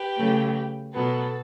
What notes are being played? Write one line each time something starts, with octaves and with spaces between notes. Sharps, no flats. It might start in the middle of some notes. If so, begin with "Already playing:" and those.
Already playing: G4 B4
C#3 F#3 A3
B2 F#3 B3 A4